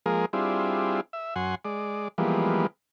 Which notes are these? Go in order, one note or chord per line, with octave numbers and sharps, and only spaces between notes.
F3 G#3 A#3 G#4 A#4
G3 C4 D4 E4 F4 G#4
E5
F#2 F#5 G#5 C6
G#3 D5
E3 F3 G3 G#3 A#3 B3